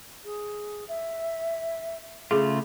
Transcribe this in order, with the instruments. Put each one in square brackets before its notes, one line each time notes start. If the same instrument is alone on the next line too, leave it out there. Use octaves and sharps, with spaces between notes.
[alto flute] G#4
E5
[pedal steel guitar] C#3 A3 F4 [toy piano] G#4